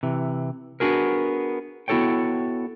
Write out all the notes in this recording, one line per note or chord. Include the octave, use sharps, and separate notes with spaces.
C3 E3
B3 D4 F#4 G#4 A#4
B3 E4 F#4 A4 C#5 G5